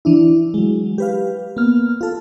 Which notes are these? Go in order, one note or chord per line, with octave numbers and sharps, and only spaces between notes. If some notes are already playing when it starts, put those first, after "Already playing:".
E3 D4 E4
F#3 G#3
G4 B4 F5
A#3 B3 F6
F4 A4